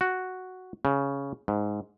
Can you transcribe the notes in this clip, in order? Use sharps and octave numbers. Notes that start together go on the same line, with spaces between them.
F#4
C#3
G#2